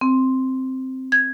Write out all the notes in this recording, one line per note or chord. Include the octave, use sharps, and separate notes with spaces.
C4
G#6